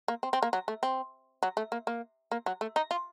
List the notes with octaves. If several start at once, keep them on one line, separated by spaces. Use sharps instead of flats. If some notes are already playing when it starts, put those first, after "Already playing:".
A#3
C4
C4
A#3
F#3
A3
C4
F#3
A3
A#3
A#3
A#3
F#3
A3
D#4
F4